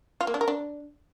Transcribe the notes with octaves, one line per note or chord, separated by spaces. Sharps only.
F4
A#3
D4
A#4
D4